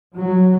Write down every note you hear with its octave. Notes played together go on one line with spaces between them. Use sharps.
F#3